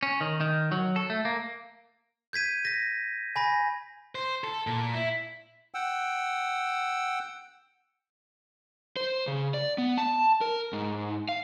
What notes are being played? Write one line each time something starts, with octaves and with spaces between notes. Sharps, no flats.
C#4
D#3
D#3
F#3
A4
A3
A#3
G6 G#6 B6 D#7
A#6 B6
G#5 B5 A#6
C5
A4
A#2
E4
F#5 G5 E6
C5
C#3
D5
B3
A5
A#4
G#2
F5